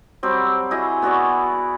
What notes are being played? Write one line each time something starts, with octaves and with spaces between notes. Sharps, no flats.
F#3 G3 C4 G4
E4 F#4 G#4 D#5
B3 F#4 D5 C#6